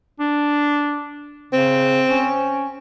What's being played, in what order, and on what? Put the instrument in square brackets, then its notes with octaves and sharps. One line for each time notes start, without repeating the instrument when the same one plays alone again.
[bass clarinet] D4
[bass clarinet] C#3 [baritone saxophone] C4
[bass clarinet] C#4